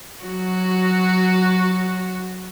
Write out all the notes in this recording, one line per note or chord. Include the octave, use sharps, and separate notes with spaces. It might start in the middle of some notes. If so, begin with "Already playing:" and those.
F#3 F#4